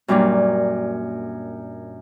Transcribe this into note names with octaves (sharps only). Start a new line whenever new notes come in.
F#2 A#2 G3 A#3 D4